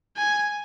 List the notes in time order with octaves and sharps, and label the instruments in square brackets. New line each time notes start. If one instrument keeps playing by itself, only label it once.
[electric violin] G#5